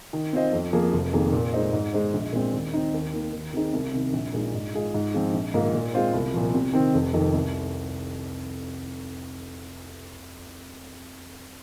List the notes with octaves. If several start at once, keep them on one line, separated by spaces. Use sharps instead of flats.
D#3
C4 F4 C5 D#5
F2
F3 A#3 G#4
F1
F2 D#3 A#3 G#4
A#2
G#3 D#4 C5 D#5
G#2
G#3 D#4 C5
A#1
A#2 G#3 C4
D#2
D#3 C4 D#4
D#2
D#3 A#3
D#2
D#3 C4 D#4 G#4
C2
C3 D#3
A#1
A#2 G#3 D#4
G#2
G#3 F4 G#4 D#5
G#2
F3 C4 F4 G#4
A#1
G#2 D#3 A#3 F4
A#2
G#3 C4 F4 C5
C2
A#2 F3
C3
D#3 C4
F1
F2 D#3
C2